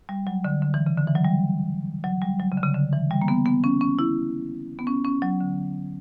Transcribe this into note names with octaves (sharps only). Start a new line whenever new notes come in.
G3
F#3
D3
D3
E3
C#3
D3
E3
F#3
G3
F#3
G3
F#3
C#3
D3
C#3
D3
E3
G3
A#3
B3
B3
C#4
C#4
E4
B3
C#4
C#4
F#3
D3